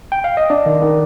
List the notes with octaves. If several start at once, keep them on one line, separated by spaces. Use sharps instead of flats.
G5
F5
D#5
D4 D5
D#3
D#3